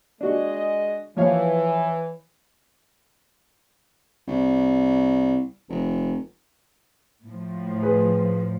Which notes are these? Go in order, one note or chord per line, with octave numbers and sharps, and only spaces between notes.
G#3 D4 F#4 D#5
E3 F3 C#5 F5
C2
F1
A2 F3
G#4 B4